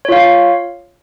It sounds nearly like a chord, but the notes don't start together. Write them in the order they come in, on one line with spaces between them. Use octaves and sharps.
C#5 F4 F5